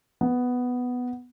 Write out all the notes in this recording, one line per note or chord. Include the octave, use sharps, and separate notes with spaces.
B3